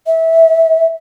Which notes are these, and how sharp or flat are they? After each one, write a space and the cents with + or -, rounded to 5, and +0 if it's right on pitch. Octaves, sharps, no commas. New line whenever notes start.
E5 -15